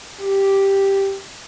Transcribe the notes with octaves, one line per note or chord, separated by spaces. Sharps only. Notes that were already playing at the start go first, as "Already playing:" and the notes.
G4